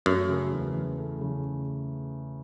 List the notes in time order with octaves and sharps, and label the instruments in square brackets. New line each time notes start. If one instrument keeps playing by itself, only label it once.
[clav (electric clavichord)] F#2 [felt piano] A3
[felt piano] C#3
E2
E3
A3
C#3